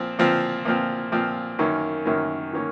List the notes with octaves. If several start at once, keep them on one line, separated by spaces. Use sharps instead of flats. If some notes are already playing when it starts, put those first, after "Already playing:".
Already playing: A#2 F3 C4
A#2 F3 C4
A#2 F3 C4
A#2 F3 C4
F#2 D#3 A#3 C#4
F#2 D#3 A#3 C#4
D#3 A#3 C#4